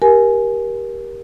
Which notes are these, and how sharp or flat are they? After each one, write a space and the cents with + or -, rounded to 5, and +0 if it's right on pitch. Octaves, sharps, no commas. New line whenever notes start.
G4 +0 A#4 +20 G#5 +10